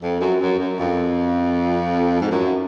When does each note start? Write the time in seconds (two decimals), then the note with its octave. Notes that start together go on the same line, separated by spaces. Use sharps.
0.01 F2
0.19 F#2
0.39 F#2
0.58 F#2
0.78 F2
2.20 G#2
2.30 F#2